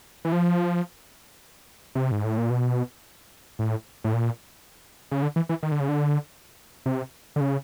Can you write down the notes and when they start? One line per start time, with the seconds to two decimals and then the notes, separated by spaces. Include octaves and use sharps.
0.25 E3
0.32 F3
1.95 C3
2.11 G#2
2.24 A2
2.37 A#2
2.50 B2
3.59 A2
4.04 A2
4.13 A#2
5.11 C#3
5.22 D3
5.36 E3
5.49 E3
5.63 D#3
5.72 D3
5.80 C#3
5.89 D3
6.86 C3
7.36 D3
7.41 C#3